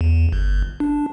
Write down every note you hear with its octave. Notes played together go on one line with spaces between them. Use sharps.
E2
G1
D4